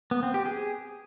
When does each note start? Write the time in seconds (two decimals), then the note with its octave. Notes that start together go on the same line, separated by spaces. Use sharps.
0.11 B3
0.23 C4
0.34 G4
0.46 G#4